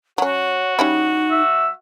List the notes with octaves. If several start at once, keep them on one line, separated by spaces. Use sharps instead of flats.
F#3 C#4 F#4 C#5
G3 C#4 D#4 E4
E5